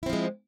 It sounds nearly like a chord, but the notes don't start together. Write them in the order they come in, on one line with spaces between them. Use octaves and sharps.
E4 C4 F3 G#3